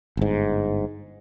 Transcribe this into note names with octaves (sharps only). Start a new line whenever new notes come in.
G1 G#2